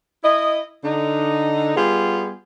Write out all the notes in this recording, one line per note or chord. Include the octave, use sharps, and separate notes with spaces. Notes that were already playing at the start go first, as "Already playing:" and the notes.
E4 D#5
D3 D#4
G3 B3 F4 G#4